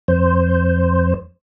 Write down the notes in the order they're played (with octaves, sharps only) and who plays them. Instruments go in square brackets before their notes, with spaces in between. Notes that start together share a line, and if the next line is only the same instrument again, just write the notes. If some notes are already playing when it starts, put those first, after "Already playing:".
[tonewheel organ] F2 C5